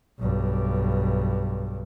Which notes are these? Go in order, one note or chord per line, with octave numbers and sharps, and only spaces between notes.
B1 G2